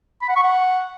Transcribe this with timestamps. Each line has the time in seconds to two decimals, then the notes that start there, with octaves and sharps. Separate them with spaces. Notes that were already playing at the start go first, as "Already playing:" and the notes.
0.22 B5
0.29 F#5
0.36 C#6
0.43 F#5